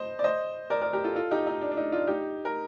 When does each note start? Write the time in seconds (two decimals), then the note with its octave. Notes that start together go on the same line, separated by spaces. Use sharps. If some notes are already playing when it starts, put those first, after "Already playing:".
Already playing: C5 D#5
0.19 D5
0.24 C5 D#5
0.70 A#4 D5
0.81 A#4 D5
0.93 G4 A#4
1.04 F4 A4
1.15 F4 A4
1.31 D#4 G4
1.47 D#4
1.61 D4
1.72 D4
1.77 D#4
1.92 D4 F4
2.07 D#4 G4
2.45 A#4